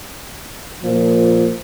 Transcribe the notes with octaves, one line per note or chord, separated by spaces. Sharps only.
A#2 F3